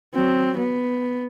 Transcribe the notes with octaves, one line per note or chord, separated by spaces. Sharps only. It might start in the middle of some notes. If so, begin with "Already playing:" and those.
F#3 C4
B3